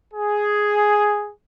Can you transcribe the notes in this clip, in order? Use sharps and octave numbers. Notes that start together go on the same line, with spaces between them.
G#4